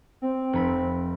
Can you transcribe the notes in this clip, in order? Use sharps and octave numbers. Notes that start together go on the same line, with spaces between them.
C4
F1 B5